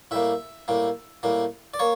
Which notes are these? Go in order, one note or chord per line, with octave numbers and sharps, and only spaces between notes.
A2 G3 A#3 E5
A2 G3 A#3
A2 G3 A#3
D5
A#3 C#5